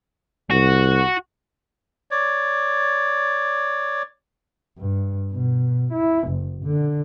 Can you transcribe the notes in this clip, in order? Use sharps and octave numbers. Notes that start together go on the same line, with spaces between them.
C2 F#4
C#5 D5
G2
B2
E4
F#1
D3